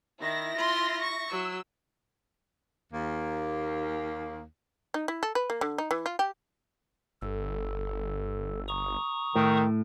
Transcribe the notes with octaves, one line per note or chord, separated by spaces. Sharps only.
D#3 E4 A#6
F4 C6
C#6
F#3 E6
D#2 A#3
D#4
E4
A4
B4
A#3
D3
D#4
E3
F4
G4
G1 A4
A#5 C#6 D#6
A2 D#3